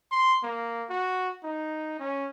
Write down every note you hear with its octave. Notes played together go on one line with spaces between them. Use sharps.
C6
A#3
F#4
D#4
C#4